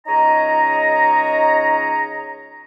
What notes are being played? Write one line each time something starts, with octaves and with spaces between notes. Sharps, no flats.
C#2 D#4 C#5 D#5 A#5